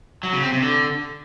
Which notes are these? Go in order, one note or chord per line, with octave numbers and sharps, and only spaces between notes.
F#3
C#3
C4
C3
D3